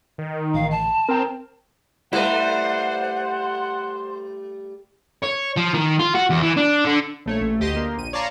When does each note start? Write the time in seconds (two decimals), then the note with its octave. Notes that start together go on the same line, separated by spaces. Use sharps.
0.18 D#3
0.54 A1 F5
0.71 A5
1.09 C4 A#4 G5
2.13 G3 A3 E4 B4 C5 F#5
5.23 C#5
5.56 F3
5.74 D#3
5.99 F4
6.15 F#4
6.30 E2
6.42 E3
6.57 D4
6.85 D3
7.26 A#1 A3 C#5
7.41 A1 A3
7.60 D2 G4 D#5 C6
7.76 A#3
7.97 A#1 D#7
8.13 C#5 D5 F5 A5 A#5 C6